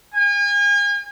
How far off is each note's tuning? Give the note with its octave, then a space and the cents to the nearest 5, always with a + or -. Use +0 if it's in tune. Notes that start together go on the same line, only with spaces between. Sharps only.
G#5 -40